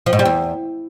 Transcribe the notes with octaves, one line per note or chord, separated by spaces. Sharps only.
F3
G#2
G3
E2